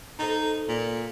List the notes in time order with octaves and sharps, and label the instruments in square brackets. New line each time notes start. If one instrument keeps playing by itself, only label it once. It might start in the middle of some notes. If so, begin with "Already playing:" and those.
[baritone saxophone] D#4 [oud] A4 C5
[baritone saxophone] A#2